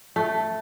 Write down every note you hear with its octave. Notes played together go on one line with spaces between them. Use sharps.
A3